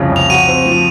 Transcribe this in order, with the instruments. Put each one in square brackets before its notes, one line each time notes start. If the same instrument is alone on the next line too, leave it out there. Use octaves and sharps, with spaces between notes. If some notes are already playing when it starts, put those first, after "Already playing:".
Already playing: [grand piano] C2 F2 C#3
[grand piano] F2 [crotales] F7
[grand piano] F#4 [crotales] D#7
[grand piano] C4
F3